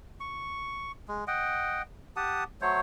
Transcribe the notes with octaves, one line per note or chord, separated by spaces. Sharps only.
C#6
G#3
D#5 F#5 G5
G4 F#5 A5 D#6
F#3 A3 C5 C#5